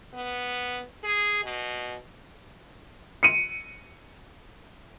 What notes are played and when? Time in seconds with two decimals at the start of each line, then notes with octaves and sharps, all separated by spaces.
0.14 B3
1.04 G#4
1.44 B2
3.23 C#7 D#7